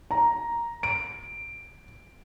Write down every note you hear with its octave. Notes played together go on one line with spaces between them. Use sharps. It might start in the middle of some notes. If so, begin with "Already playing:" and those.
A#5
D7